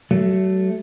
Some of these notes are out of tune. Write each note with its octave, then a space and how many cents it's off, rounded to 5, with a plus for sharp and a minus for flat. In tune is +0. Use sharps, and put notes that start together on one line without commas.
F#3 +35 A3 +0